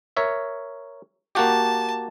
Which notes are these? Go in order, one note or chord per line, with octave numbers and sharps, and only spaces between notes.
A#4 C#5 E5
A#3 F#4 G4 A5